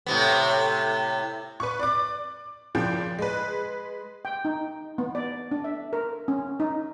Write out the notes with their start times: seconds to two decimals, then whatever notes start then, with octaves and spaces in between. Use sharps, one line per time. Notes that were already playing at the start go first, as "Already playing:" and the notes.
0.06 A2 C3 B3
1.60 B4 C#6
1.79 D5 D6
2.75 A#2 C#3 F3 G5
3.19 G#3 B4
4.25 G5
4.45 D#4
4.98 B3
5.15 D5
5.51 D4
5.64 E5
5.93 A#4
6.28 C#4
6.60 D#4